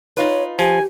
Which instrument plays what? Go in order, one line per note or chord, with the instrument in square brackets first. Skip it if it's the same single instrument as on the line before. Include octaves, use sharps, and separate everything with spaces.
[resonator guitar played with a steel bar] D#4 F4 B4 [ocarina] C#5
[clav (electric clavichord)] F3 [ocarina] G4 [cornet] G#5